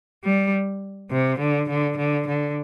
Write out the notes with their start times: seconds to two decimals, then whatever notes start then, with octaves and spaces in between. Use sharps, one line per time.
0.23 G3
1.11 C3
1.39 D3
1.69 D3
1.97 D3
2.26 D3